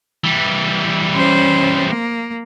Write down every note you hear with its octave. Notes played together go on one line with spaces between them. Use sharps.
E3 G3
C#4 C5
A#3